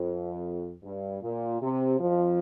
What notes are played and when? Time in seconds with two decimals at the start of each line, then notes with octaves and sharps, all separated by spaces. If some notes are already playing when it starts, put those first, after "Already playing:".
Already playing: F2
0.83 G2
1.22 A#2
1.61 C3
2.00 F2 F3